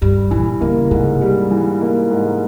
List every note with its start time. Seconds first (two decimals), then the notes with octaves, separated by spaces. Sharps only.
0.01 G2 G3
0.31 A#2 E3
0.61 C#3 A#3
0.91 G#2 C3
1.21 G3
1.51 E3
1.81 A#3
2.10 G#2